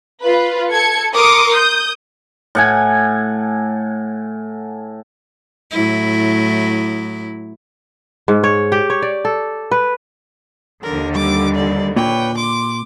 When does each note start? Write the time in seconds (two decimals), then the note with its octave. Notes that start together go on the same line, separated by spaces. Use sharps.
0.22 F4 B4
0.72 A4 G#6 C#7
1.14 A#4 C6 D6 D#6 C#7
1.52 D#6 G6
2.55 A2 F#5 G#5
5.71 A2 F#3 E4
8.28 G#2
8.44 C#5
8.72 G4
8.90 C#5
9.02 D5
9.25 A4
9.71 B4
10.83 D#2 D3 A#4
11.15 G3 D6
11.55 D5
11.96 A#2 B4 C#5 G5
12.38 C6 D6